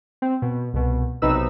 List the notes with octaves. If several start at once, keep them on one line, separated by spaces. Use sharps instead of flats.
C4
B2
C2 B2
B1 C3 D#4 B4 E6